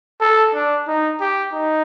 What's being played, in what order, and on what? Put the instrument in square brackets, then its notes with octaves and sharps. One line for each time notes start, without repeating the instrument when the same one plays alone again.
[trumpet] A4
D4
D#4
G4
D#4